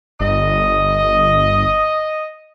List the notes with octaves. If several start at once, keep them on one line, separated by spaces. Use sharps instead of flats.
G1 D#5